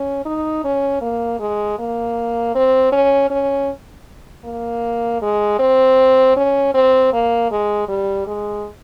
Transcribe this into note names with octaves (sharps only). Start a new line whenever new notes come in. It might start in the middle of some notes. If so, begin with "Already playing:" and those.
Already playing: C#4
D#4
C#4
A#3
G#3
A#3
C4
C#4
C#4
A#3
G#3
C4
C#4
C4
A#3
G#3
G3
G#3